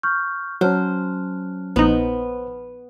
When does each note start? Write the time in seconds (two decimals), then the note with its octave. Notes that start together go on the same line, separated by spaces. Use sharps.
0.03 C#6 F6 G6
0.61 F#3 C#4 C5 A5 F6 F#6
1.76 A#1 B3 D#4 C5